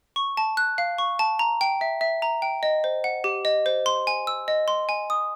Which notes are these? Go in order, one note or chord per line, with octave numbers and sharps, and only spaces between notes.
C#6
A5
F#6
F5
C#6
A5
A#5
G5
E5
E5
A#5
G5
D#5
C5
F#5
G4
D#5
C5
C6
G#5
E6
D#5
C6
G#5
D#6